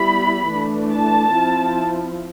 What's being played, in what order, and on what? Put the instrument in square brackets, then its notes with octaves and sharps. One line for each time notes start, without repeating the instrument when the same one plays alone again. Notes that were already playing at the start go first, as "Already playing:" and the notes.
Already playing: [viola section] G3 B3 E4 B5
E3 A3 D4
A5
F3 C4 E4